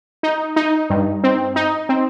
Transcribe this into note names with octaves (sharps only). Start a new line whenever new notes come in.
D#4
D#4
G2
C4
D#4
C4